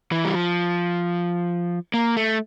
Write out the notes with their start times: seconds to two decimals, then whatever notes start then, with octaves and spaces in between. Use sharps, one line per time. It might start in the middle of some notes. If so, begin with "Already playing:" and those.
0.12 E3
0.25 G3
0.35 F3
1.94 A#3
2.17 A3